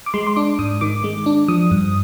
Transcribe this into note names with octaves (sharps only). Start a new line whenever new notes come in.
D6
G#3 C6
C6
D4 D6
G#2 D#6
D#3 D6
G#3
D4
F3 D#6
G2